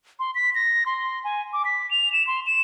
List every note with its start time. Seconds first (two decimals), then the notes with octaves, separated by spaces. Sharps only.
0.19 C6
0.35 B6
0.55 A#6
0.86 C6
1.24 G#5
1.53 D6
1.65 B6
1.91 F7
2.13 E7
2.27 C6
2.46 E7